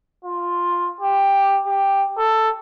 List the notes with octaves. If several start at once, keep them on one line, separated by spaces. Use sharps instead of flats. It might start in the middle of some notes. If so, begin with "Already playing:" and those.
F4
G4
G4
A4